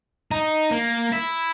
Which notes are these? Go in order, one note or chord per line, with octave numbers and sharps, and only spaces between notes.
D#4
A#3
E4